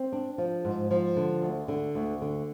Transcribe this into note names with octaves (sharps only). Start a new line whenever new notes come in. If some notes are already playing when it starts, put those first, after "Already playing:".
Already playing: C4
D4
F3
G#2
F3
D3
D2
D3
D2
D3